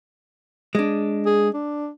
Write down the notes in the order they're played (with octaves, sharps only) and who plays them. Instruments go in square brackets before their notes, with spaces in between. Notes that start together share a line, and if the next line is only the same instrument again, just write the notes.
[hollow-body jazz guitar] G#3 D4
[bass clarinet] G#4
D4